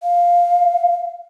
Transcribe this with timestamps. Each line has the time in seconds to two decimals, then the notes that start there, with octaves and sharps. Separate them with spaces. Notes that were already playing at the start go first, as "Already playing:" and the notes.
0.03 F5